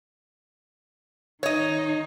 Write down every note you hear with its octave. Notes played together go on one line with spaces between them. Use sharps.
D#3 D#4 C#5 D#5